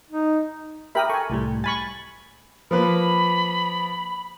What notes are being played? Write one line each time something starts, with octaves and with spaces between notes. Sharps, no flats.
D#4
G4 A#4 E5 G5 B5 D#6
A4 G5 G#5 C#6
C2 A2 G3
G#5 B5 C#6 A6
F3 A#3 B4 B5